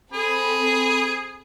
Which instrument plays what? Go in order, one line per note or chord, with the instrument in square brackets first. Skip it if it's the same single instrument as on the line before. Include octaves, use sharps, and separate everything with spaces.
[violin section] C4 A4 B5 [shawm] G#4